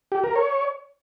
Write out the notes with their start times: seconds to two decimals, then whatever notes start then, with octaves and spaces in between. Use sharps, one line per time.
0.12 G4
0.24 A#4
0.36 C#5